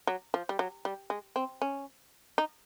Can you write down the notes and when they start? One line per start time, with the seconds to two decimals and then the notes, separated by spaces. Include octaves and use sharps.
0.07 F#3
0.34 F3
0.49 G3
0.59 F#3
0.85 G3
1.10 G#3
1.36 C4
1.62 C#4
2.38 D#4